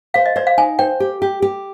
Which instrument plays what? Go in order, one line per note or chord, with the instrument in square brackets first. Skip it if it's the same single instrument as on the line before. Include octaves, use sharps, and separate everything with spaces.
[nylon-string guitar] C5 [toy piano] F5
[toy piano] D#5
[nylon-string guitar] C5 [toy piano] D5
[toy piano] F5
[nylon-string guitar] D#4 [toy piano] G#5
[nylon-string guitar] C5 [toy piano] G5
[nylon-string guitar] G4
G4
G4